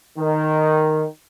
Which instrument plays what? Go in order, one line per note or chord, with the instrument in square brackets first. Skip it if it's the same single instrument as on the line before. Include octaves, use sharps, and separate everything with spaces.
[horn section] D#3